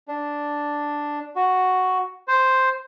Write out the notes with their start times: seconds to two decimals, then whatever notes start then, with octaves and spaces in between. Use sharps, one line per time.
0.08 D4
1.36 F#4
2.28 C5